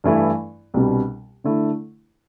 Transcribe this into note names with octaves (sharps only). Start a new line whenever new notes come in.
G2 E3 A3 E4
C2 B2 G3 D4
D3 A3 E4